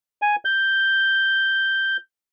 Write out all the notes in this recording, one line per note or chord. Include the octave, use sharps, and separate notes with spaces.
G#5
G6